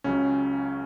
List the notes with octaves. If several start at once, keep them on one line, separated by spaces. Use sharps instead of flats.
C#2 C#3 F#3 C#4